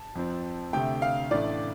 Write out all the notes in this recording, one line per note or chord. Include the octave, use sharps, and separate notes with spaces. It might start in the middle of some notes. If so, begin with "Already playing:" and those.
Already playing: A5
F2 F3 C4
D2 C3 A3 G5
F5
A1 A2 A3 D4 D5